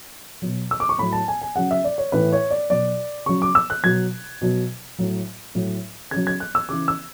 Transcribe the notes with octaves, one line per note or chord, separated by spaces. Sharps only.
B2 F#3
E6
D6
C#6
A2 F#3 B5
A5
G#5
G#5
C#3 F#3 F#5
E5
D5
C#5
A2 E3 B4
C#5
D5
B2 F#3 D5
C#3 F#3 C#6
D6
E6
F#6
B2 F#3 G#6
B2 F#3
A2 F#3
A2 F#3
C#3 F#3 G#6
G#6
F#6
E6
C#3 E3 D6
E6